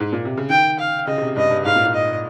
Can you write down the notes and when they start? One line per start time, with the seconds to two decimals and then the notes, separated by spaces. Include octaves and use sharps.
0.00 G#2
0.12 A#2
0.25 C3
0.37 C#3
0.50 D#3 G5
0.79 F5
1.07 C#3 D#5
1.18 C#3
1.22 C3
1.36 G2 D#5
1.51 G2
1.65 G#2 F5
1.76 A#2
1.84 G#2
1.95 D#5